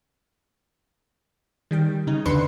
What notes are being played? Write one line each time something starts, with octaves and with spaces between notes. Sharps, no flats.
D#3 G3 G5
C#3 D#4
E2 D3 D4 B4 C6 C#7